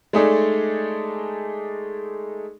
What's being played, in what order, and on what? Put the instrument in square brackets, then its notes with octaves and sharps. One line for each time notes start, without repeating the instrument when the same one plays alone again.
[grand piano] G#3 A3 D#4 G#4 A4 D5